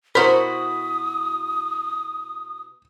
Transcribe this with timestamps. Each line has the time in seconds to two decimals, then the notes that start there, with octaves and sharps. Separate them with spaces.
0.15 B2 E4 F#4 A#4 C5 B5 D#6 B6